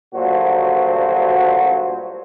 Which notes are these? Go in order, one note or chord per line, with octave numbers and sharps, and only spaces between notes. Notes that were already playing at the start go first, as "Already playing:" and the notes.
D2 G2 A#2 F#3 F#4 C5